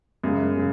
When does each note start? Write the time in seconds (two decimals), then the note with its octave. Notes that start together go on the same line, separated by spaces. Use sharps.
0.24 F#2 C#3 G#3
0.57 C#3